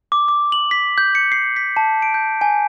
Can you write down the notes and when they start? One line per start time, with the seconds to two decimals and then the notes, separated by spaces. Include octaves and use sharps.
0.12 D6
0.28 D6
0.52 F#7
0.71 B6
0.98 G6
1.15 C#7
1.32 C7
1.56 B6
1.77 A5
2.02 D7
2.14 G6
2.41 G#5